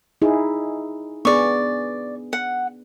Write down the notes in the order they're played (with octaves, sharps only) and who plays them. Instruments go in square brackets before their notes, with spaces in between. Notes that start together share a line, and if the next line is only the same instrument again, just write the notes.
[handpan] D#4 E4 G#4
[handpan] B3 D4 G#4 [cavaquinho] D5 C#6
[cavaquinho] F#5